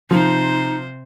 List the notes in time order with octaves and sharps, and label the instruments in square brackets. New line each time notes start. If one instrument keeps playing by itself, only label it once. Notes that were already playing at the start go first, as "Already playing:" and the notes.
[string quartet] C3 C5 [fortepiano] F3 [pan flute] D#4